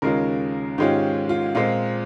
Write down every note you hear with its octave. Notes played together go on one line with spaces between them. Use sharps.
D#2 C#3 G#3 C#4 F4 A#4
G#2 D#3 G#3 C#4 F4 G4
F4
A#2 G#3 C4 F4